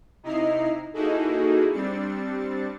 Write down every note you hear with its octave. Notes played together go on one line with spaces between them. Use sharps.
C3 D#4 E4 D#5 A#5 C7
A#3 D#4 E4 F#4 G#4 A4
G3 C4 D4 A6 C#7